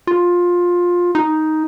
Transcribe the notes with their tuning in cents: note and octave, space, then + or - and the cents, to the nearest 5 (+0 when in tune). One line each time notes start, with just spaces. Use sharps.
F4 +15
D#4 +5